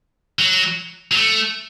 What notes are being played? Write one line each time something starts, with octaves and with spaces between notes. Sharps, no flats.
F#3
F#3
A3